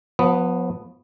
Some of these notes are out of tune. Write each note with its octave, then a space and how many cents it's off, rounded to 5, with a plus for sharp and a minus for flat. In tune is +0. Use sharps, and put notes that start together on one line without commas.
F3 +40 B3 +0